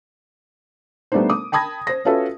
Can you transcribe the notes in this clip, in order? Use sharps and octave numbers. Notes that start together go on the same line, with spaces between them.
G3 A3 B3 D4 D#4 C5
D6 D#6
G5 A5 B5 D#6 G#6 A#6
C5 A#6
C#4 F4 F#4 A4 B4 E5